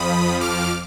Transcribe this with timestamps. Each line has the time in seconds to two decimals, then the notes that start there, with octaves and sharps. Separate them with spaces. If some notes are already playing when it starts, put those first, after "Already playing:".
Already playing: F2 F3 B5 D#6
0.41 D6 F6